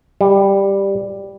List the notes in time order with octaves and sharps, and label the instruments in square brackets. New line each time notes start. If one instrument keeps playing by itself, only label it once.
[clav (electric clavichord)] G3